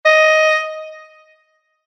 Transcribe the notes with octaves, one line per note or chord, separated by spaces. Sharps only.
D#5